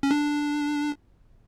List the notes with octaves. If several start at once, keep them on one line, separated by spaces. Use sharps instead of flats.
C#4
D4